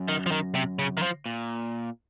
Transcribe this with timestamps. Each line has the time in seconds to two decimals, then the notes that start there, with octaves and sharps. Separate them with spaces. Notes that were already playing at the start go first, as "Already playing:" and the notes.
Already playing: F#2
0.08 D#3
0.26 F3
0.31 D#3
0.55 C3
0.79 C#3
0.97 D#3
1.02 F3
1.26 A#2